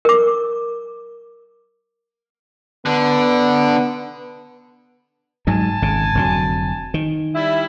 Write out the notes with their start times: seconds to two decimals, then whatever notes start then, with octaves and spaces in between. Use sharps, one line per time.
0.05 A#4 D6
2.86 D3 B3
5.47 G#2 F#3 G#3 G#5 A5
5.82 G#1 C#3
6.15 F1 D3 F#3
6.94 D#3
7.35 G3 E4